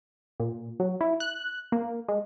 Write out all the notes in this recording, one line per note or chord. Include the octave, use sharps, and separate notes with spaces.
A#2
F#3
E4
F#6
A#3
G#3